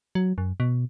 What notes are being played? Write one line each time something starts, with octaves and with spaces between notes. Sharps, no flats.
F#3
F#2
B2